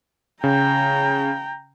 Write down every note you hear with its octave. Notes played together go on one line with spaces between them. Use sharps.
C#3 G5 A#5